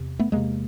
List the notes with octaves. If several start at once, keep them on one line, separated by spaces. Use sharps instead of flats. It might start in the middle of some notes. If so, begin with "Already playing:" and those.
Already playing: E2 C3
A3 B3
E2 C3 G#3 A#3